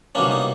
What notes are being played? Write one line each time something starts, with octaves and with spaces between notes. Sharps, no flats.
C2 B2 G3 A#3 C#4 D4
D#4